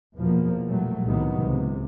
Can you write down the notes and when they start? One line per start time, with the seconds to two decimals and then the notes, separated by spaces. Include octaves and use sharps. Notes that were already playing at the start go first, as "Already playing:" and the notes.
0.17 E2 B2 F3 A#3
0.69 A#2 F#3 G3 A3
1.07 C2 A2 C3 D#3 F#3 B3
1.39 C#2 C3